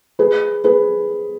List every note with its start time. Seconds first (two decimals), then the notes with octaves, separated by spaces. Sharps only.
0.19 G#4 B4
0.64 G#4 B4